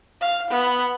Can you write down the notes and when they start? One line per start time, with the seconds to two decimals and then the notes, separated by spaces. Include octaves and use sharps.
0.21 F5
0.51 B3